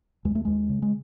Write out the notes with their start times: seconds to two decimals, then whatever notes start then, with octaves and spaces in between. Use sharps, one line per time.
0.25 D#2 G#3
0.35 A3
0.45 D#2 G#3
0.69 C#3
0.82 G#3